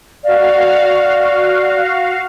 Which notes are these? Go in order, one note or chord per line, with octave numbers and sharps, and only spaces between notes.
F#4 D5 F5